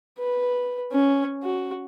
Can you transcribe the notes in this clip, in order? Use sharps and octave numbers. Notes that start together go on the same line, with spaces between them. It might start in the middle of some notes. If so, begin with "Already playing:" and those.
B4
C#4
F#4